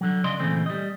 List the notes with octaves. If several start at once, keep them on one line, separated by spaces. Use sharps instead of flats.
D3 F#3
C#3 D5 D#5 C6
A#2 C#3 E3 A3 C4
G3 D#5